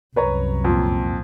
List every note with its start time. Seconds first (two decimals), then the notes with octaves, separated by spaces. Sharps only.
0.16 C2 F#2 B4 C#5 A#5
0.64 F2 A#2